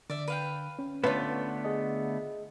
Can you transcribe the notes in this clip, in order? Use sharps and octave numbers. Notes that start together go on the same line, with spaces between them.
D3 D5 E5
B4 F5 G5
C#4
D3 A3 B3 F4 B4 C#5 B5
G#4 D#5